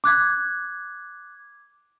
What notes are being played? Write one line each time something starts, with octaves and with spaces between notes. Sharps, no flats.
D6 F#6 G#6